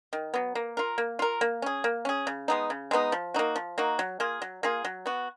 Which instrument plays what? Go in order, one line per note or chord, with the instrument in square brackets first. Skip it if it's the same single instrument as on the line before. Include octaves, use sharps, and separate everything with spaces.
[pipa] D#3
F#3 B3
A#3
F4 A#4
A#3
F4 A#4
A#3
C#4 G#4
A#3
C#4 G#4
C#3
G#3 B3 D#4
C#3
G#3 B3 D#4
F3
A#3 D#4 F#4
F3
A#3 D#4 F#4
F#3
A#3 F4 G#4
F#3
A#3 F4 G#4
F#3
B3 F#4